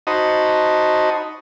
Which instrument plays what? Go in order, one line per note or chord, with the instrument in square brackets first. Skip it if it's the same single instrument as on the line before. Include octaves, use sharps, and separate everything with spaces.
[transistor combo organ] D#4 F#4 C5 D#5 A5 B5